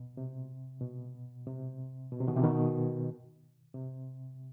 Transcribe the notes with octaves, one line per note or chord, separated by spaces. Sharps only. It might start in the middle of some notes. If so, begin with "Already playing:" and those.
Already playing: B2
C3
B2
C3
B2
C3
B2 D#3
C3 E3
B2 D#3
C3